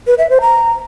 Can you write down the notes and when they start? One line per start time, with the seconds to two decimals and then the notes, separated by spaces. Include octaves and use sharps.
0.07 B4
0.18 E5
0.30 C5
0.41 A#5